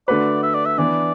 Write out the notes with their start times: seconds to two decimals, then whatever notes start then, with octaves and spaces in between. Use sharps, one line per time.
0.08 D3 A3 F#4 B4 D5
0.43 E5
0.54 D5
0.66 E5
0.78 E3 B3 D4 D5